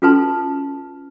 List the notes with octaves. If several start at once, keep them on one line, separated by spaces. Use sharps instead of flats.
C#4 F4 A4 B4 A5 C6